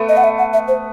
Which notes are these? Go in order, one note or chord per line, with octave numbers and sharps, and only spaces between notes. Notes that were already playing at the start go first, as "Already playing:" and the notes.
Already playing: A3 B3
D#5
F#5
E5
F#5
E5
C5